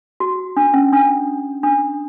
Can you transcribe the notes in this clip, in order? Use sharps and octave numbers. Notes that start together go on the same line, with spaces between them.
F#4
D4
C#4
D4
D4